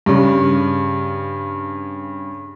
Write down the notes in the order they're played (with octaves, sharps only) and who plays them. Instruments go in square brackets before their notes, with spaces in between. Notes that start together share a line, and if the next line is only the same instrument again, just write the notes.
[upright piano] G2 C#3